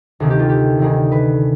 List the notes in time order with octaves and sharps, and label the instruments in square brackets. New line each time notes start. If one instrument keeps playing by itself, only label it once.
[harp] D2 C3 D#3 G#4
G4
F4
G4
D2 C3 D#3 G#4
B4